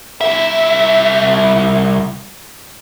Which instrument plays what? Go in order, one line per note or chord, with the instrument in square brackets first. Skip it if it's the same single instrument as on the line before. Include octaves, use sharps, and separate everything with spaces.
[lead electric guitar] C2 E5